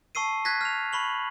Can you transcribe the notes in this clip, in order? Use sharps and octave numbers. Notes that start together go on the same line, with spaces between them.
A5 C#6 E6 C7 D#7
F#6 G#6 A#6 B6
F6 F7
B5 C#6 F#7